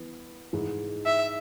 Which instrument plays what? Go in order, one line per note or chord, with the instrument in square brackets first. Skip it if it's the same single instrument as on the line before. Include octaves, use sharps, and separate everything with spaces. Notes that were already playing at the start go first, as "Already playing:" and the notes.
Already playing: [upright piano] E3 B3
G#2 E3 G#3
[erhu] E5